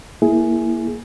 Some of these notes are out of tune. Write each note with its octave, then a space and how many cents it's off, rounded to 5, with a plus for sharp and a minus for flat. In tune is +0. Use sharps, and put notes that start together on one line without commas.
A#3 +10 E4 +0 G#4 +10